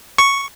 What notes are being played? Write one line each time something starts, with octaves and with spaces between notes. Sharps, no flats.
C#6